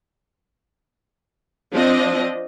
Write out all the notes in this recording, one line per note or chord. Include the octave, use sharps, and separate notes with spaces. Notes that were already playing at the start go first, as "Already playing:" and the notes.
F3 C4 D4 D#5